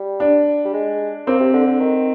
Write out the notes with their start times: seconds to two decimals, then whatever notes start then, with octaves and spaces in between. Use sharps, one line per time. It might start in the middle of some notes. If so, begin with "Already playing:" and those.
Already playing: G3
0.20 D4
0.65 G3
0.74 G#3
1.27 A#3 C4
1.40 C3
1.54 D3
1.67 D3
1.80 D#3